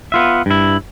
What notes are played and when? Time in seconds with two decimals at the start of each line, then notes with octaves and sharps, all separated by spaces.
0.12 B3 F4 E5
0.46 G2 E4